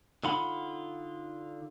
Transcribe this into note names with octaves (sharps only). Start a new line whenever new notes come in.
D3 D#4 F4 F#5 B5